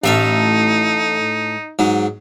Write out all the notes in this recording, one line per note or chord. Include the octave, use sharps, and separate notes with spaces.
A1 A2 A3 D#4 A4 E5 F5
G#2 F#3